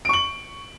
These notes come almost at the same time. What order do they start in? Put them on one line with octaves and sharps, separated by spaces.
D7 C#6 F#7